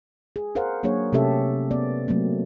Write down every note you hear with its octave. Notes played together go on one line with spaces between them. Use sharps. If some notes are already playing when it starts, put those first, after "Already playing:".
G#4
G#4 A#4 C5 F5 F#5
F#3 A#3 D4 G#4 C#5
C3 A3 C#4 G4 A4 E5
B3 D5
F#3 A3 A#3 C4